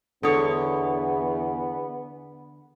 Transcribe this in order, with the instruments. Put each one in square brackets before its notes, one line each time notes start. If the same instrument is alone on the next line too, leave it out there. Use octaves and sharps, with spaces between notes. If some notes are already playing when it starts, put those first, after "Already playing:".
[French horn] E2 [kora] D3 C#5 [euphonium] B3 [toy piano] A4 D#6